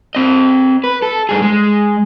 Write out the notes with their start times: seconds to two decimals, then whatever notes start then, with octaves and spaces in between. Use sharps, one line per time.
0.15 C4 D#5
0.84 B4
1.02 A4
1.29 G2 G#4
1.42 G#3